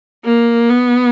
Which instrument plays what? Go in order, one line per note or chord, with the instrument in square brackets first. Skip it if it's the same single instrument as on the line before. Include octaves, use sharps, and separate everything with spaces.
[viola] A#3
B3